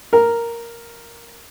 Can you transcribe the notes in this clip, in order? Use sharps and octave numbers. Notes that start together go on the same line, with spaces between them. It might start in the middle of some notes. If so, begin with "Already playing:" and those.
A#4